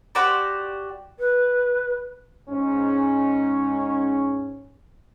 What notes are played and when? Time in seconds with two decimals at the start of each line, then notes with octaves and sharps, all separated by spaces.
0.15 F#4 G4 C5 D5
1.19 B4
2.50 G#2 C#4